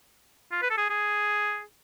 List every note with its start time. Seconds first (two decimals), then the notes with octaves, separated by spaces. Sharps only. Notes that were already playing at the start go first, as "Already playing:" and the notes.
0.52 F4
0.62 B4
0.70 A4
0.78 G#4
0.90 G#4